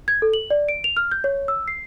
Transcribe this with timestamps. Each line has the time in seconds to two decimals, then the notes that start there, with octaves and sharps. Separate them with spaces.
0.08 G#6
0.22 A4
0.33 F#7
0.50 D5
0.69 D7
0.84 F7
0.97 F6
1.12 G6
1.24 C#5
1.48 E6
1.68 C7